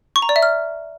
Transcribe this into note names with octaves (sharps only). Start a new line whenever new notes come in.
C#6
A#5
D5
E5
F6